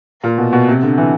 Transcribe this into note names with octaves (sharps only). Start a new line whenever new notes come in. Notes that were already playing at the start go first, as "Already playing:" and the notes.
A#2
B2
B2
C3
D3
E3